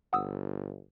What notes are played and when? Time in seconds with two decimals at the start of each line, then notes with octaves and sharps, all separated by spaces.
0.13 G1 F#5 D#6 E6